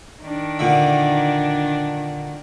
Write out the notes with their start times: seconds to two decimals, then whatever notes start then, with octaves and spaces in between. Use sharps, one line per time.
0.22 D#3 D4
0.59 A#2 D3 E5